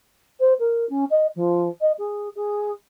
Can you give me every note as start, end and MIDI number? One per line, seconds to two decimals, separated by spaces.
0.39 0.53 72
0.59 0.87 70
0.89 1.04 61
1.10 1.26 75
1.35 1.68 53
1.81 1.91 75
1.98 2.28 68
2.35 2.71 68